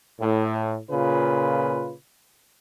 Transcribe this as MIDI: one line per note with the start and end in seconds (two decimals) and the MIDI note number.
0.20 0.76 45
0.90 1.93 46
0.90 1.93 49
0.90 1.93 65
0.90 1.93 71